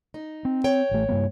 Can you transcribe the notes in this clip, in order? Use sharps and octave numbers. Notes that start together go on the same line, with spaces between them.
D#4
C4
C#5 G5
A1 A3
G2 A#3 B3